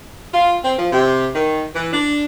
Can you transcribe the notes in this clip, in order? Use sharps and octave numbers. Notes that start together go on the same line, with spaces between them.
F4
C4
F3
C3
D#3
E3
D4